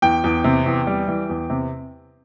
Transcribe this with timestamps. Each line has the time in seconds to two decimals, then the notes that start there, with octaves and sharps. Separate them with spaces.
0.02 E2 G5
0.24 E2
0.44 C3
0.66 E2
0.87 G3
1.08 E3
1.29 E2
1.50 C3